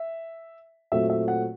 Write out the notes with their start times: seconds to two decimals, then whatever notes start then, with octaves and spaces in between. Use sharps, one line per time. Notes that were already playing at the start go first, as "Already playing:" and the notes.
Already playing: E5
0.92 A#2 F#3 A3 C4 E5
1.10 E5
1.28 F#5